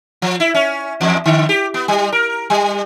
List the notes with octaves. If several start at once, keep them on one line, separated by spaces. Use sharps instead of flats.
F3
E4
C#4
E2
D3
G4
B3
G3
A#4
G3